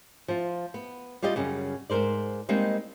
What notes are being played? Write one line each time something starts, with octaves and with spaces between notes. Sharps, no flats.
F3 F4
B3
G3 F4 G4 D5 D#5
F#2 C#3 G3
G#2 C3 A#4 C5 D5
G3 G#3 A#3 C4 D#4